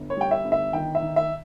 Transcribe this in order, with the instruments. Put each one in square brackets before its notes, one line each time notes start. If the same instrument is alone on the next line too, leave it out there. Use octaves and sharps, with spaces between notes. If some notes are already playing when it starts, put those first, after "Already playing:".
Already playing: [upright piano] G1
C#5
G3 G5
E5
G1
E5
D#3 G5
E5
D#3
E5